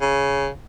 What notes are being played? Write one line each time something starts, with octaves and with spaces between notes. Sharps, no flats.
C#3